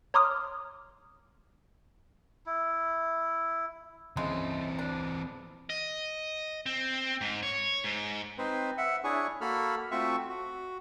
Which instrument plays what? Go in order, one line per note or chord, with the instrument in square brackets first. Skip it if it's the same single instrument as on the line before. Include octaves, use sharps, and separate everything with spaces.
[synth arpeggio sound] C#5 A#5 C6 D6 D#6 F6
[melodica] E4
[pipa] C#3 G#3 A3 [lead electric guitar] E3 C4
[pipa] D4
[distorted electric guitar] D#5
C4
G#2
C#5
G#2
[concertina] C4 D#4 B4 C5
E5 F#5
D4 E4 G#4 C#5 G#5 C#6
A#3 F#4 A4 B5 F6
A3 C4 F4 F#4 E5 C#6
F#4